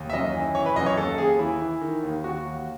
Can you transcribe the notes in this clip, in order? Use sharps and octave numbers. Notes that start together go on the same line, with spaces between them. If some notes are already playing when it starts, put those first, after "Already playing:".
Already playing: D#2
E5
F#2 D#5
E3
E3 C#5
B4
F#2 D#5
C#5
D#2 A4
D#2 G#4
E3 E4
E3
D#3
D#2
D#2 F#4
D#2